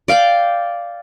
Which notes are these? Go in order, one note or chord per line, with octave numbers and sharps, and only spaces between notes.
D5 F5 G5 D6